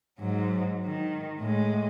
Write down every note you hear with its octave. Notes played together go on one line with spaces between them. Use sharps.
G#2 F#3
D#3
A2 G#3